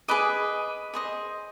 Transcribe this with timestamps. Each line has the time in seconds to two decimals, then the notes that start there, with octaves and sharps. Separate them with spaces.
0.08 G#4 B4 D#5 D6
0.94 G#4 C5 D#5